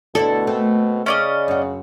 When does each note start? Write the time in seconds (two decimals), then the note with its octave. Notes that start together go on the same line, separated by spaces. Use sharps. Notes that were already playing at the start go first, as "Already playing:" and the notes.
0.15 D2 B2 E4 A4 D5
0.47 A3 A#3 C4
1.06 C#3 C#4 D5 D#5
1.48 F#2 F#4